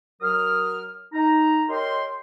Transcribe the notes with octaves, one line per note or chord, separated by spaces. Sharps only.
F#3 A#4 D#6 F6
D#4 A#5
G4 A#4 C#5 D#5 G5 C6